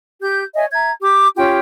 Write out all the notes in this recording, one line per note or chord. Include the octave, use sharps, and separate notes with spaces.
G4 G6
C#5 D#5 E5 G#5
E5 A#5 G#6
G4 D6
C#4 F4 G4 G5